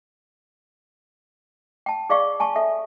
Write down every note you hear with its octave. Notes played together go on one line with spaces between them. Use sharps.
G5 A5
G#4 D5 F5 C#6
G#5 A5 C#6
A4 E5